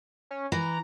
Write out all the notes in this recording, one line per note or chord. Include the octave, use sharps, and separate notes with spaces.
C#4
E3 A#5